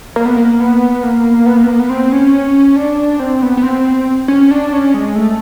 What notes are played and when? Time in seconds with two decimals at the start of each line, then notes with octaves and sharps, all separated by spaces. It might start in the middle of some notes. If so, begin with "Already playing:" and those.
0.16 A#3
0.26 B3
0.36 A#3
0.60 B3
1.03 A#3
1.46 B3
1.57 A#3
1.63 B3
1.68 A#3
1.79 B3
1.90 C4
2.12 C#4
2.76 D4
3.20 C4
3.42 B3
3.57 B3
3.63 C4
4.28 C#4
4.51 D4
4.73 C#4
4.94 G#3
5.15 A3